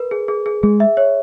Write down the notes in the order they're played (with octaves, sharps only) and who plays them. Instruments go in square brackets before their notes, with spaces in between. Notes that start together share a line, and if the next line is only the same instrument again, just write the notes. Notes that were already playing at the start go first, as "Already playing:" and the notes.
Already playing: [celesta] A#4 B4
G#4
G#4
G#4
[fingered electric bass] G#3 [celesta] G#4
[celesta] E5
C#5